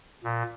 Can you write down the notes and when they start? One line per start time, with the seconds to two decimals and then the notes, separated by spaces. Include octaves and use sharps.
0.24 A#2